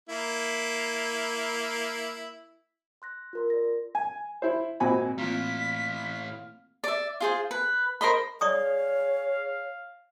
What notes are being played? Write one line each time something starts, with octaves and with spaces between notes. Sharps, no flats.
A#3 E4
C6 F#6 A#6
F4 A#4 C6
D5 A#6
G#5
E4 C5
G#1 A#2 C4 F#4 G#5 B5
A2 E3 A#3 C4 F4 F5 B6
D5 E5
F4 G#4 C5
B4
A#4 C5 D#5 B5
G#4 C#5 D5 F5 C#6 D#6